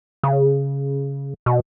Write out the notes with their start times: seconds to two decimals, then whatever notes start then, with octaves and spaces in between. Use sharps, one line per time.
0.23 C#3
1.46 B2